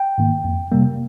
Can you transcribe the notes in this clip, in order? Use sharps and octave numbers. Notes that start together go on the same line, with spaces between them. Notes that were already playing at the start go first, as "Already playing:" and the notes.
Already playing: G5
G#2 D#3 A#3
F2
C3 G3 A#3